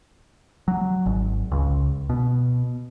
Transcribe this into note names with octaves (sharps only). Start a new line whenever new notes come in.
F#3
G#1
C#2
B2